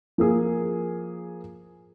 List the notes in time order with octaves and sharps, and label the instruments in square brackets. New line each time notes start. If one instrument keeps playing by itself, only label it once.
[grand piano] F3 A#3 G#4